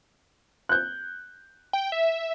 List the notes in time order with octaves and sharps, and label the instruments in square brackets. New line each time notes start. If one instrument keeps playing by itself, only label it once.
[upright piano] F#6 G6
[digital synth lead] G5
E5